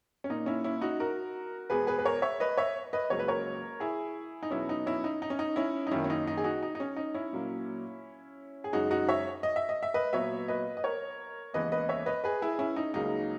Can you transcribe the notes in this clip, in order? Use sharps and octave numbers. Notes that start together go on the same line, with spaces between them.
C#4
A#2 A#3 D#4
C#4 E4
C#4 E4
D#4 F#4
F#4 A#4
E2 B2 G#3 B3 G#4 B4
G#4 B4
B4
A#4 C#5
C#5 E5
B4 D#5
C#5 E5
B4 D#5
C#2 C#3 F#3 A#3 C#5
B4
A#4 C#5
E4 G#4
D#4
E2 B2 F#3 B3 C#4 E4
D#4
C#4 E4
D#4
D#4
C#4
D#4
C#4 E4
D#4
F#2 D#3 A#3 C#4 E4
C#4
D#4
D#4
G#4
D#4 F#4
D#4
D#4
C#4
D#4
C#4 E4
A#2 F#3 A#3
G#4
F#2 C#3 G#3 D#4 F#4
D#4 F#4
C#5 E5
D#5
E5
D#5
E5
B4 D#5
A#2 F#3 B3 C#5 E5
B4 D#5
D#5
A#4 C#5
D#2 C#3 E3 G#3 B3 B4 D#5
B4 D#5
C#5 E5
B4 D#5
G#4 B4
E4 G#4
C#4 E4
D#4
C#2 C#3 F#3 A#3 D#4